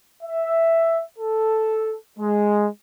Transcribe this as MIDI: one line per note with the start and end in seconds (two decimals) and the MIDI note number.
0.22 1.02 76
1.18 1.95 69
2.18 2.67 56